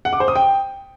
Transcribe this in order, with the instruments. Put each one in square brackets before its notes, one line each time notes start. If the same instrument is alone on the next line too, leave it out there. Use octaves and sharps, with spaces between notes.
[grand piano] F#5
D6
C5
D#6
G5